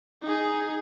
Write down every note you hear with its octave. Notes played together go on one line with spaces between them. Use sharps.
D#4 G#4